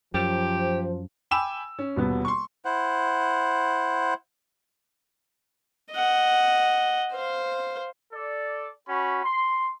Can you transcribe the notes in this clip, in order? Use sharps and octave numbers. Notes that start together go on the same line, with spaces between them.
F#2 F3 G4 C5
G5 G#5 B5 D6 E6 E7
C#4
D#1 B2 B3
C6 C#6
E4 C5 F#5
D#5 F#5
C5 F5
A4 D5
C#4 F#4 B5
C6